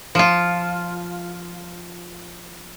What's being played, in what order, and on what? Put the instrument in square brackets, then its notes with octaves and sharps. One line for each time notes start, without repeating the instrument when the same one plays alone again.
[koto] F3 F4